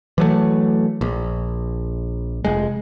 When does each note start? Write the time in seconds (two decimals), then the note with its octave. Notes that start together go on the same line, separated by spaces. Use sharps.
0.18 E3 F#3 A3
1.01 A#1
2.45 F1 G#3